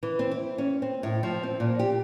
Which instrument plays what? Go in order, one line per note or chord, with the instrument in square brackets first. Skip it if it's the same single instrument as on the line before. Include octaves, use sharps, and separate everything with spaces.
[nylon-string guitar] E3
C4
E4
C#4
C4
A2
F3
C4
A#2
G4